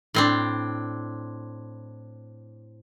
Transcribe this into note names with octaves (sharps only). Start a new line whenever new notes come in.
A2 C4 D4